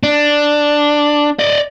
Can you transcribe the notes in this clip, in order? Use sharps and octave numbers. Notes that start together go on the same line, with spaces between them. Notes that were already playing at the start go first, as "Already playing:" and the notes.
D4
D5 D#5